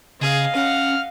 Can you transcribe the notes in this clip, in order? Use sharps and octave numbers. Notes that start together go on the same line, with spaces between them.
C#3 G#4 D#5 F5
C#4 F#5 F6